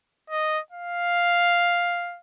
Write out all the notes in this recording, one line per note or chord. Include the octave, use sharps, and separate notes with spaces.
D#5
F5